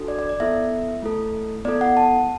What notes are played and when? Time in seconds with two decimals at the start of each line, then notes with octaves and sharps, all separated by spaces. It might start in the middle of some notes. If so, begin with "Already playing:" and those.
Already playing: D4 F#4 A4
0.08 D5
0.19 D5
0.29 D5
0.40 B3 E4 A4 E5
1.02 A3 E4 A4
1.65 B3 E4 A4 D5
1.81 F#5
1.97 A5